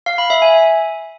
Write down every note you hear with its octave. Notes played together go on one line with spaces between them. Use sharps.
F5
B5
E5
G#5